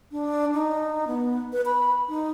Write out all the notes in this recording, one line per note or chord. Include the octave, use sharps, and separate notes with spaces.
D4
D#4
B3
B4
B5
D#4